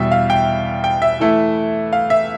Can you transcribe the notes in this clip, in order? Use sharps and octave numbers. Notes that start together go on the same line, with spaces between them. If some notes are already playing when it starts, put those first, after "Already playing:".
Already playing: E2 B2 G3 E5
F5
G5
G5
E5
E3 A3 E4
F5
E5